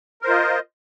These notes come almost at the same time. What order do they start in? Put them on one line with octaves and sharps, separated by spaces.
A#4 C5 F4 D#5